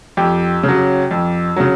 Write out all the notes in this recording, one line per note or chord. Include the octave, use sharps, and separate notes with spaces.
F2 G4
C#3
F#3
F2
C#3 F#3